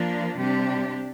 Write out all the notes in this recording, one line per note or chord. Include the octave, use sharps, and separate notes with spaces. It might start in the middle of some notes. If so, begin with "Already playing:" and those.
Already playing: F3 A#3 D4
C3 G3 D4 G4